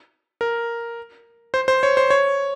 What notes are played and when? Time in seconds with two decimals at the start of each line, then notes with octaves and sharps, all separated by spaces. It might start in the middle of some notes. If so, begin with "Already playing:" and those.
0.41 A#4
1.54 C5
1.68 C5
1.83 C#5
1.97 C5
2.10 C#5